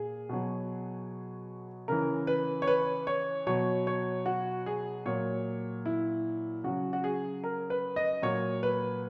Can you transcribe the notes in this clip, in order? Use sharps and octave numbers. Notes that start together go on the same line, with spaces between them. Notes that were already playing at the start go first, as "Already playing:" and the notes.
Already playing: A#2 G#4
B2 F#3
C#3 E3 A#4
B4
C#5
B4
C#5
B2 F#3 C#5
C#5
F#4
G#4
A#2 F#3 C#5
E4
C#3 F#3 F#4
F#4
G#4
A#4
B4
D#5
A#2 F#3 C#5
B4